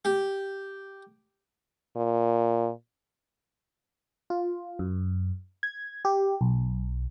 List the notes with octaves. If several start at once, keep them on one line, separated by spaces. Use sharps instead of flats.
G4
A#2
F4
F#2
G#6
G4
B1